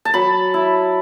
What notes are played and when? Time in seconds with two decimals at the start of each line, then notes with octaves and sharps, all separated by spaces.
0.05 A5
0.14 F#3 B5
0.54 E4